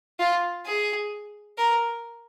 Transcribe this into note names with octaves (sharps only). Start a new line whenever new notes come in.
F4
G#4
A#4